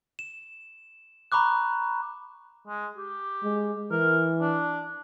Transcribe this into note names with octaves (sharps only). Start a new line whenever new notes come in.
E7
A#5 B5 C#6 D6 F#6
G#3
G4
G#3
E3 A#4
D4